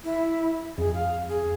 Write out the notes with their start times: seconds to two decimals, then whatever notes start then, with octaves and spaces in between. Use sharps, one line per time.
0.04 E4
0.78 F2 G#4
0.94 F5
1.29 G#4